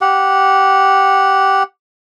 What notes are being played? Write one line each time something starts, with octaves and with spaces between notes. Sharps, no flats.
G4 F#5